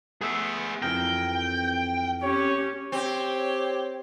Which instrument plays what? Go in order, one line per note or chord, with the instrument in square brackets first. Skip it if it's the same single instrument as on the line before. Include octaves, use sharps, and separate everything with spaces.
[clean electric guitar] A3 B3 [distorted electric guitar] G#4 E5
[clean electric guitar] F2 E3 A#4 [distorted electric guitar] G5
[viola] C#4 G4 [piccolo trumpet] C#5
[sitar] C4 [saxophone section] G4 [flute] C#5